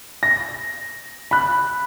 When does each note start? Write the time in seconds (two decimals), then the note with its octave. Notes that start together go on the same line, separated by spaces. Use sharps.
0.23 A#6
1.31 B5 F#6